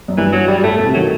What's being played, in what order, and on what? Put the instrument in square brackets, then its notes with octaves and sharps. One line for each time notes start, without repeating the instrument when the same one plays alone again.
[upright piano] F#2
[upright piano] G2 [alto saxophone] E3
[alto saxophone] F#3
G3
G3
[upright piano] A2 [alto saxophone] A3
[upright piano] B2 [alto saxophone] A3
[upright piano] C3
[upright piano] D#3 [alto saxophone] F#3